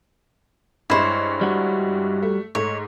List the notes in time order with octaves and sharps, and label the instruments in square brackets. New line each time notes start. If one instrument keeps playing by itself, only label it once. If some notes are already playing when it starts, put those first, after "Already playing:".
[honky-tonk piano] G2 G#3 C#5 [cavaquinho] E4 C5
[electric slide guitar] G3 F#4
[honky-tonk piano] A3
[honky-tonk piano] G#2 A3 [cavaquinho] C#5